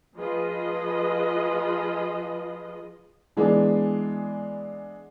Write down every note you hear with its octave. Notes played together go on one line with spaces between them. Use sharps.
F3 F4 G#4 B4 D#5
E3 G#3 B3 D4 G#4 D5